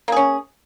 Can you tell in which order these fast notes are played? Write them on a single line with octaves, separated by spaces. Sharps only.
A#3 G#4 C#4